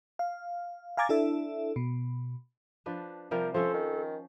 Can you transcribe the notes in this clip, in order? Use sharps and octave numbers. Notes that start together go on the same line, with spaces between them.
F5
F5 G#5 A#5 D6 G#6 A6
D4 E4 A4 E5
B2
F3 D4 B4
C3 F3 G3 A#4
F3 C#4 A4 C5
D#3